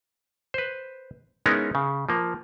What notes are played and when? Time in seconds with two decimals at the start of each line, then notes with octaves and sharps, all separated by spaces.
0.54 B4 C5
1.46 G#3 B3 C#4 D#4 E4 A#4
1.75 C#3
2.09 F3 A#3